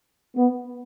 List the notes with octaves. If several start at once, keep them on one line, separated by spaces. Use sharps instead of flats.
B3